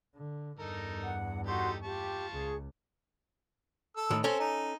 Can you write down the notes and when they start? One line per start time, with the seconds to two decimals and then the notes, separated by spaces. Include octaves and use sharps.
0.16 D3
0.59 E2 G2 D#4 A4 A#4
1.04 F#5
1.47 D#4 F#4 G4 A4 C6
1.83 F4 G4 A5 C#6
2.32 C#2 G#4
3.97 A4 E6
4.10 A2 D#3
4.24 C4 C#4 A4
4.39 D#4